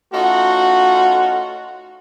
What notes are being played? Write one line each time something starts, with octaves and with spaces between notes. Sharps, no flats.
A3 C#4 D#4 F4 F#4